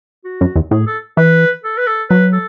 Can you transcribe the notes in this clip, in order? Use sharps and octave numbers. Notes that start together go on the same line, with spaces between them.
F#4
F#2
E2
A2 G#4
A4
E3 B4
A4
B4
A4
F#3 B4
A4